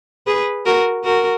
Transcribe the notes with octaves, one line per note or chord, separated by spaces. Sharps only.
G#4 B4
F#4 A#4
F#4 A#4